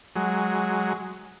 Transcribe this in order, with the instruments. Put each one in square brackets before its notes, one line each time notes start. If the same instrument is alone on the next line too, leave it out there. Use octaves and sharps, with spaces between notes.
[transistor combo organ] F#3 G#3